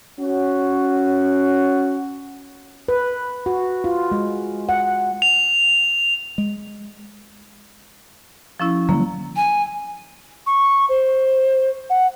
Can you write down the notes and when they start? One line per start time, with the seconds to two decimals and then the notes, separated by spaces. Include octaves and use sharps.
0.20 C#4 F#4
2.88 B4
3.46 F#4
3.84 F4
4.12 G#3
4.69 F#5
5.22 F7
6.38 G#3
8.60 F3 C#4 E4
8.89 D3 F#3 G3 A#3
9.36 G#5
10.46 C#6
10.89 C5
11.90 F#5